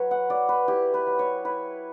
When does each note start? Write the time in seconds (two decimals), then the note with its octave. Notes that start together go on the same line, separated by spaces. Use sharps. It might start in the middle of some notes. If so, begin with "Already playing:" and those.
Already playing: F#3 B4 C#5
0.11 F#5
0.30 F#3 D5
0.49 B4
0.68 E4 G4
0.94 B4
1.07 F#3
1.19 C#5
1.45 E4 B4